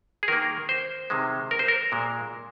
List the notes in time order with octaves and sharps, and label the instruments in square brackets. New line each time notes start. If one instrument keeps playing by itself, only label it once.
[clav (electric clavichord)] G#4
D#3 A#3 A#4
C5
C3 D#3 G#3
A#4
C5
A#4
A#2 G#3